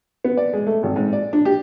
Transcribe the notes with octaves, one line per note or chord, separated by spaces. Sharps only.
B3
D5
G#3
A3
G#1
G#2
D5
D4
G4